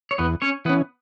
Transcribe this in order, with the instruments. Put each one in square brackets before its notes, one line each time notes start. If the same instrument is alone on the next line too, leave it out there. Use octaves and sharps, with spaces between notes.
[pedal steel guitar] C#5
[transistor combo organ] E2 [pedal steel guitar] B3 B4
[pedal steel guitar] C#4 C#5
[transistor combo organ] E3 [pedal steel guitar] B3 B4
[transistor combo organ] C#4